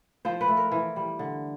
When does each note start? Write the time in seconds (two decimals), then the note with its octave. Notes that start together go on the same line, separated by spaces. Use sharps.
0.25 F3 C5
0.41 B4
0.48 A3
0.57 A#4
0.71 E3
0.96 G3
1.19 D3